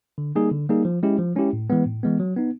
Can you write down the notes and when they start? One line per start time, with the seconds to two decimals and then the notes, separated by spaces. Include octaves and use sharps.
0.18 D3
0.35 G3 A#3 D#4 G#4
0.52 D3
0.69 G3 A#3 D#4 G#4
0.85 F3
1.03 G#3 C#4 E4 G4
1.19 F3
1.36 G#3 C#4 E4 G4
1.53 A2
1.70 E3 G#3 B3
1.86 A2
2.03 E3 G#3 B3
2.20 F#3
2.36 B3 D#4